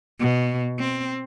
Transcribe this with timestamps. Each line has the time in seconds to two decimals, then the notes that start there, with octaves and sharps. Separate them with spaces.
0.20 B2
0.79 C4